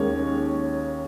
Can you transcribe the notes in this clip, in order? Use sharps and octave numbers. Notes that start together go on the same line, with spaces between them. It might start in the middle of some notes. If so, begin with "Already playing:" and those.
Already playing: D#2 D#3 G#3 C#4 C#5